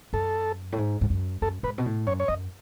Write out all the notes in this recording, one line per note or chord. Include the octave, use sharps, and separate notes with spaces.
F#2 A4
A2
G#2
G#2
F#2
F#2 A4
G#2 B4
B2
A2
F#2 C#5
C#5
F#2 D#5